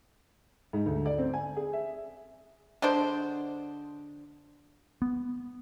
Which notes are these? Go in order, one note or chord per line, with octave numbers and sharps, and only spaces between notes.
G#2
D2
D5
C4
G#5
G#4
E5
D3 G#3 D4 C5
B3